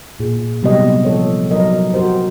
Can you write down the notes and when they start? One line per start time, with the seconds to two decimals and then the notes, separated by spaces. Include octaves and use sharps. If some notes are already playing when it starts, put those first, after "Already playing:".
0.20 A#2 G#4
0.62 C3 F#3 G3 B3 G4 D#5
1.05 F3 A4 C#5
1.51 F#3 A#4 D#5
1.94 F#4 G4 A#4 C5